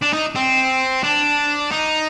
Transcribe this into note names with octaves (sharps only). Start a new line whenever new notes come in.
D4
D#4
C4
D4
D#4